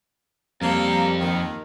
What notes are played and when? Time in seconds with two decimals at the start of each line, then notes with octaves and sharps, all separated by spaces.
0.62 F2 G3 A#3 C4 A4
1.21 D#2 D#3